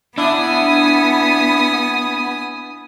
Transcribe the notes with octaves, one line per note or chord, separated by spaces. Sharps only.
B3 D4 E4 G#5 D#6